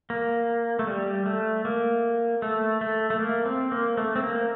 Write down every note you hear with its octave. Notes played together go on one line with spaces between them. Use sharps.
A#3
A3
G3
A3
A#3
A3
A3
A3
A#3
C4
A#3
A3
C4
A#3